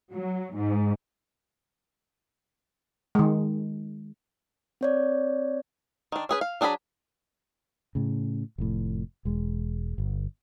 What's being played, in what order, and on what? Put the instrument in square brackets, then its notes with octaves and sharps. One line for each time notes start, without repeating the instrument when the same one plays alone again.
[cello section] F#3
G#2
[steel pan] D#3 G#3
[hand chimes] C4 C#5 D5
[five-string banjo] D#3 D4
C#4 G#4 B4
F5
F#3 D4 G#4 A#4 B5
[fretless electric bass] A2 C#3
F1 F2 A2
E1 G#3
G1